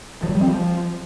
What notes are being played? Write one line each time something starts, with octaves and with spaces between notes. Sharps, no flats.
F3
F#3
G3
C4
F3